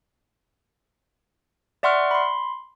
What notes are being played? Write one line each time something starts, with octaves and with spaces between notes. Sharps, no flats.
D5 E5 F#5 C6 C#6 F6
B5 C6